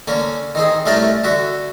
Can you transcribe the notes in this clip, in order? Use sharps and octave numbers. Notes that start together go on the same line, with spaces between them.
D3 A#3 C#4
D#3 C4 G#4
C2 A3 C#4 A#4 A5
D3 F#4 E5